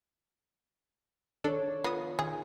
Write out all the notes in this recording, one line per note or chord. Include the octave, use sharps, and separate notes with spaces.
D#3 D4 A4 C#5
B3 F4 D#6 A#6 C7
D#3 G#4